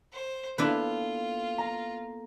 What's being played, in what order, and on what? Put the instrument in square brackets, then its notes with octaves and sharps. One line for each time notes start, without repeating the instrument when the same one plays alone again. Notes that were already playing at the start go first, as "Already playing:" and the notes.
[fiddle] C5
[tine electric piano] A#3 B3 A4 [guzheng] D4 E4 B4 [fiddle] F4
[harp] A#5